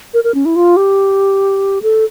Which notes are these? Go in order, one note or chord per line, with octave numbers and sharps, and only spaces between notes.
A#4
A#4
C#4
E4
F4
G4
A4